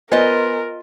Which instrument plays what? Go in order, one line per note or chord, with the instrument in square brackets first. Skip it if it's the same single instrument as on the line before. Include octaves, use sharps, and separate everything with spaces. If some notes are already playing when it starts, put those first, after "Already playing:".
[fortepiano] B3 G#5 [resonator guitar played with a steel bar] F4 C5 D#5 [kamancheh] A#4